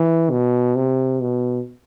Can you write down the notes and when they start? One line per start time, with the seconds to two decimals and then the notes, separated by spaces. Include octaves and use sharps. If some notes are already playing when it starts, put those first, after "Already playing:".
Already playing: E3
0.31 B2
0.76 C3
1.21 B2